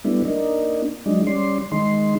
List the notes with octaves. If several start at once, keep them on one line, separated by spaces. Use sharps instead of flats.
G3 A3 B3 D4 E4
A#3 D4 D#4
F#3 G#3 D4 D#4
G3 C#4 D5 C6
D#3 G#3 D#4 C6